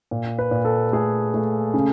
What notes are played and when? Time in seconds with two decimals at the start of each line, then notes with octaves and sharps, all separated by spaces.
0.11 A#2
0.39 B4
0.51 A#2
0.65 A4
0.92 A3 G#4
1.34 A3
1.74 C#3